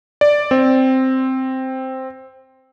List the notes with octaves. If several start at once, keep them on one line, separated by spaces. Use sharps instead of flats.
D5
C4